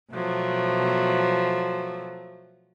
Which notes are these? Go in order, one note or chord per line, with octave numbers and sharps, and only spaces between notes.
B2 F3 F#3 A3